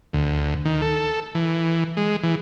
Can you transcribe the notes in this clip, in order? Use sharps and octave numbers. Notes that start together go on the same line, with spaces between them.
D2
D#3
A4
E3
G#3
E3